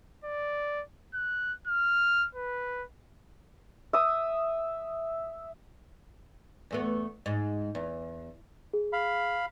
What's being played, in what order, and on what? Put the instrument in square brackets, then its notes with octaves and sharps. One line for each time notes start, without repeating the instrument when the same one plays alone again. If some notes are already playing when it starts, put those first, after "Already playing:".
[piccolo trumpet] D5
F#6
F6
B4
[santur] E5 D#6
[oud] E2 A3 B3
G#2
E2
[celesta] G#4
[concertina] F5 B5